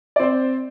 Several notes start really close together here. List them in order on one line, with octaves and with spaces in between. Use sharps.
D5 C4 C5